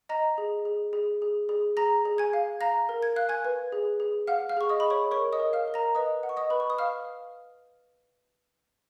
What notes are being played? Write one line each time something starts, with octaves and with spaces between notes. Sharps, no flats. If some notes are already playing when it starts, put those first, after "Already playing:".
D#5 A#5 A#6
G#4
G#4
G#4
G#4
G#4
G#4 A#5 A#6
G#4
G#5 G#6
F5
F5 A#5 A#6
A#4
G#6
F5 F#6
G#5 G#6
B4
G#4
G#4
F5 F#5 F6
F5 F6
G#4 C#6
D#5 D#6
G#4 B5
C#5 C#6
A#4 C#5 C#6
D#5 D#6
A#4
F5 F6
A#4
A#5 A#6
B4 D#5 D#6
F#5
C#6
D#5 D#6
B4 B5
C#6
D#6
F5 F6